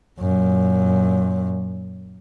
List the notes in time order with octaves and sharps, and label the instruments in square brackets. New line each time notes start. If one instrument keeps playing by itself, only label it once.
[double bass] F#2 A#2